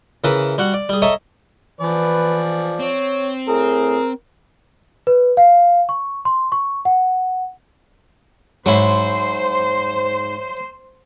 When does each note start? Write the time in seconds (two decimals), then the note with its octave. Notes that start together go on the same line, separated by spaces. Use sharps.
0.24 C#3 E3 E4 A#4 B4
0.58 G3 F#4 F#5
0.74 D5
0.89 G3 G#4
1.02 A4 C#5 D#5 E5 G#5 A#5
1.81 E3 F3 B4 D5
2.80 C4 C#5
3.49 A2 G#4 A#4
5.07 B4
5.37 F5
5.89 C#6
6.25 C6
6.52 C#6
6.85 F#5
8.66 G#2 F#3 E4 C5